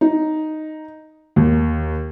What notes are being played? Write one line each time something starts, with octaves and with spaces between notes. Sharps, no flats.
D#4
D#2